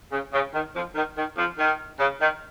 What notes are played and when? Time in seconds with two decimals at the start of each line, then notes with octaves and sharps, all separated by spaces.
0.11 C#3
0.33 C#3
0.53 D#3
0.74 F2 F3
0.95 D#3
1.16 D#3
1.37 F2 F3
1.58 D#3
1.99 C#3
2.20 D#3